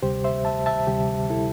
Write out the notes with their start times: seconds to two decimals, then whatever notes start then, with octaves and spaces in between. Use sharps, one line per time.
0.02 D2 C3 G3 G4 C5
0.24 C5 E5
0.45 E5 A5
0.66 E5 A5
0.87 D2 C3 G3 G4
1.30 E4 A4